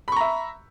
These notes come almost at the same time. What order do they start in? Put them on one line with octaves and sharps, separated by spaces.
B5 C#6 A#5 E5